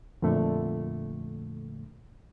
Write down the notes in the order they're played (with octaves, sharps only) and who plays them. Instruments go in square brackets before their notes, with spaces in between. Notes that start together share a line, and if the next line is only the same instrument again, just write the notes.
[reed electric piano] F2 A#2 D3 A3